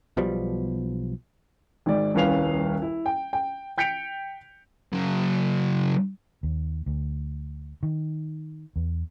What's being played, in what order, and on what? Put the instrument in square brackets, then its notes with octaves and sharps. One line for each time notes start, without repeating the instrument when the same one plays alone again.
[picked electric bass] B1 B2 F3 G3
[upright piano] G#1 G#2 D5
D#1 C2 C#4 B4 F5 F7
E4
G5
G5
G5 G6 B6 C#7 D7 F7
[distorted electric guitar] C#3 F#3
[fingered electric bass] D#2
D2
D#3
E2